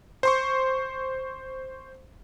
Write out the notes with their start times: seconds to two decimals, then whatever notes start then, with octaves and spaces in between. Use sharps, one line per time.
0.23 C5 C6 C#6